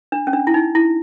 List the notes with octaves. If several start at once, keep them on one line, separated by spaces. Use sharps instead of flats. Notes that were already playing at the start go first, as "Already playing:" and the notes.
D4
C#4
D4
E4
D#4
E4